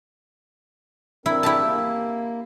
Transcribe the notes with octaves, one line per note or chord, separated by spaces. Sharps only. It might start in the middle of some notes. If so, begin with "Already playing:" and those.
C4 D4 E4 A#4
E4 G4 A5
A#3